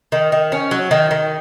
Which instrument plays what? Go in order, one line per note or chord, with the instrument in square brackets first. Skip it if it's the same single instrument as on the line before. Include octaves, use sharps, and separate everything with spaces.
[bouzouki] D#3
D#3
C#4
F#3
D#3
D#3